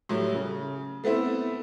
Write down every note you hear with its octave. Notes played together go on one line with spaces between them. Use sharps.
A2 F#3 G3
C#3
A3 B3 C4 E4